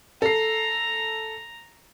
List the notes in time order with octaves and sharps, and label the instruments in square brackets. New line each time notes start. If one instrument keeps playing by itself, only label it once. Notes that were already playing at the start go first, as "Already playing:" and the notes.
[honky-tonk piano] A4 C7 [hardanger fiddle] A#5